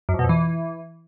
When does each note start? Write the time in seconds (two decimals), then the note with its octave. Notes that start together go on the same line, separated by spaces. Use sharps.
0.09 F#2
0.14 F2
0.19 B2
0.24 F2
0.29 E3